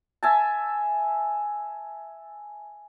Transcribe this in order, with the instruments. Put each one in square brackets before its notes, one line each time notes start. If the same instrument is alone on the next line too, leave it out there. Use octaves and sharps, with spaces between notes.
[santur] E5 G#5 A5